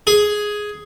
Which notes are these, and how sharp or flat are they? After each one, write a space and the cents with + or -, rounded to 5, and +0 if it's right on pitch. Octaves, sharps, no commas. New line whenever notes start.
G#4 +5